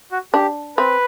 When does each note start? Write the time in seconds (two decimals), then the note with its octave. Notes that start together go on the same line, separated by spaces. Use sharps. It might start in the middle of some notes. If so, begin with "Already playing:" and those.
0.12 F#4
0.34 D4 G4
0.77 C4 B4